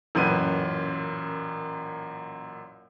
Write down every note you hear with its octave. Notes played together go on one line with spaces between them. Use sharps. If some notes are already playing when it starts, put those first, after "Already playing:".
A1 F#2 A#2 B4 D#7